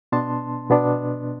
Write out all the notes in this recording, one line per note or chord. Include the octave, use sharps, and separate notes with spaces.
B2 B3 D4 A5 C6
B2 B3 D4